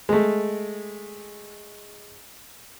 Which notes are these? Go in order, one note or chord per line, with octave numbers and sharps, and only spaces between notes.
G#3 A3